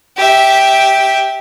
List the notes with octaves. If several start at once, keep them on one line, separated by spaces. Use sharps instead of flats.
G4 E5